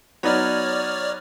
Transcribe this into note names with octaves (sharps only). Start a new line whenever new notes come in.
F#3 B3 D#4 C#5 D5 F6